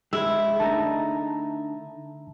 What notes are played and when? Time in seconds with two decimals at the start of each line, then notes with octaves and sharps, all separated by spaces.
0.13 G#3 E4 G4 E6
0.60 D3 A3 D#4 A5 A#5